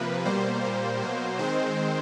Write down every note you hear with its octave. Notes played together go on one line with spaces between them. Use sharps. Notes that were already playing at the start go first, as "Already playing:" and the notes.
Already playing: C3 F3 A#3 B4
B2 G3 A#3 C5
A#2 G3 A#3
B2 F#3 A#3
D#3 G#3 C4 C5